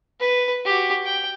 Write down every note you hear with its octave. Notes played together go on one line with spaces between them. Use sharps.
B4
F#4 G4
G5